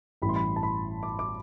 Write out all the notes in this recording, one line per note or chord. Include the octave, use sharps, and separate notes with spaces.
A1 G2 E3 G3 B5
C6
B5
A5
B5
D6
D6